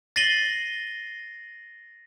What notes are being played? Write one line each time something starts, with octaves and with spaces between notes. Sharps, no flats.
A6 A#6 C7 D#7 F#7 G7